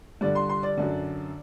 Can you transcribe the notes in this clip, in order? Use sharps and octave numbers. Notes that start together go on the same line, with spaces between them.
G2 D3 D5
C6
C6
D5
F#2 D3